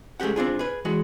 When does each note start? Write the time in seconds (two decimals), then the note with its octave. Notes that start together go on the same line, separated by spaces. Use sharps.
0.20 G#3 A3 C#4 G4 F#5
0.36 C4 D4 F4 G#4
0.59 G#4 B4
0.85 E3 G#3 F#4